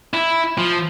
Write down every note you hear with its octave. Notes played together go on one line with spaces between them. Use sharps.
E4
F3